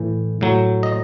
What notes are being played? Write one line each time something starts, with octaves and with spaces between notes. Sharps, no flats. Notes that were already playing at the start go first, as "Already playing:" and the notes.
Already playing: A2 E3
A2 F#3
D#5